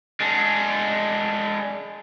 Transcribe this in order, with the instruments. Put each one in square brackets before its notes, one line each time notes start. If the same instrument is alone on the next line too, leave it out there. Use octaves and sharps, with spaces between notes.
[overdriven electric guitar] G#3 D4